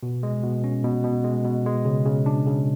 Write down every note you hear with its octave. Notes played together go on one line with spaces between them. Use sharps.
B2
G#3
B2
C#4
B2
B2
G#3
B2
G#3
C#3
C#3
D4
C#3